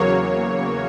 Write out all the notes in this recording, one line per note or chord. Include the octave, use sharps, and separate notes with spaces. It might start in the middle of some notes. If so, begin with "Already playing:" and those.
Already playing: E2 C#3 F#3 A#3 C#5